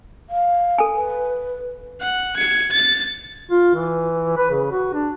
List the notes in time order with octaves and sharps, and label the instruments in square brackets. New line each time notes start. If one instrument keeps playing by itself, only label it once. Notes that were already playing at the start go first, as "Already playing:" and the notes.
[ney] F5
[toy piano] A4 G#5
[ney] B4
[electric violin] F#5
G#6 C#7
A6
[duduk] F4
E3
B4
C#3
F#4
D4